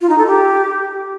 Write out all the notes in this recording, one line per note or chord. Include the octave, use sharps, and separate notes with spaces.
F4
D#4
A4
G4